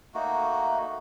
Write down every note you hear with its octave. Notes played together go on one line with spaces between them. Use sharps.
A3 A#3 D#4 F#4